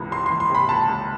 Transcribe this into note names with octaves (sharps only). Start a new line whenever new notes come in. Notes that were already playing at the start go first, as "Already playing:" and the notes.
Already playing: C#2 C3 E3
C#2 C6
E3 C6
C6
C3 B5
C#2 A5
C#2